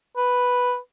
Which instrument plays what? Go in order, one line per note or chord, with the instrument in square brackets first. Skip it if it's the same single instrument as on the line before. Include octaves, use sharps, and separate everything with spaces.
[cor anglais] B4